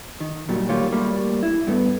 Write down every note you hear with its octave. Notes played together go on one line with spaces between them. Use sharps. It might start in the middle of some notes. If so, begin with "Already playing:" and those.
D#3
A#2 D#3 F#3 G3
G3 A3 A#3 F4 G4 C#5
G3 A3 A#3
E4
G2 A3 B3